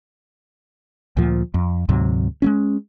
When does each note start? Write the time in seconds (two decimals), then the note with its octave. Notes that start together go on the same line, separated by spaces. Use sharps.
1.17 D2 A#2 F3
1.54 F2
1.89 D2 G#2 C3 F#3
2.42 G#3 A3 C#4